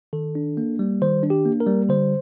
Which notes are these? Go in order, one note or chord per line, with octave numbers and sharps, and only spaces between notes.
D#3 A4
D4
A#3
G3
D#3 C5
D4
G4
A#3
A#4
G3
D3 C5